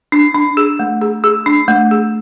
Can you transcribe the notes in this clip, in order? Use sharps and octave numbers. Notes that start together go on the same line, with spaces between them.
D4
D4
G#4
A3
G#4
G#4
D4
A3
G#4